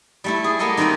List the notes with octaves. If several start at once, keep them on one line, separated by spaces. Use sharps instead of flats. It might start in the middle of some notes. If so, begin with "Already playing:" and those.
G3 A3 E4
G#4
A#3 B3 E4 A4 A#4 D#5
D#3 G3 C4 F4 G4